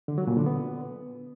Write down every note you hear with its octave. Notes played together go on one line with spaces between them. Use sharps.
D3
F#3
A#2
D3
B3